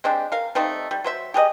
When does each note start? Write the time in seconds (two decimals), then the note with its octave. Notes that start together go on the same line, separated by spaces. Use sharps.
0.04 G#3 C4 D4 G4
0.32 A#4 F5
0.55 G3 A3 C4 D#4
0.91 G3
1.04 F#3 C5 E5
1.34 G4 G#4 A#4 D#5